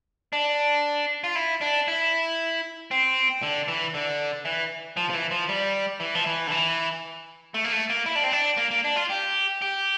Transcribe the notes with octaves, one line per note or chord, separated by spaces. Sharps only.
D4
F4
E4
D4
E4
C4
D3
E3
D3
E3
F3
F3
E3
F3
G3
E3
F3
E3
D3
E3
A3
A#3
A3
A#3
E4
D4
C4
D4
A#3
A#3
D4
F4
G4
G4